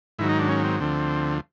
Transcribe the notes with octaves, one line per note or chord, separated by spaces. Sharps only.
G#2 D#3 F#3 E4
D#4
D4
C#4
C4
D2 D3 F3 C4